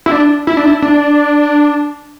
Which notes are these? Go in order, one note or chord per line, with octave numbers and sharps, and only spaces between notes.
E4
D4
E4
D4
E4
D4